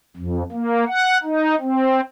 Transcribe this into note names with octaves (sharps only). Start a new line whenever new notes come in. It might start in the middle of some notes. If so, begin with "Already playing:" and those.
F2
A#3
F#5
D#4
C4